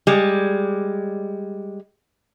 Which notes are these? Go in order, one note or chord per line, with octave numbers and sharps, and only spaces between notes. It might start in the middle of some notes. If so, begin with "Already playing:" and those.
G3 G#3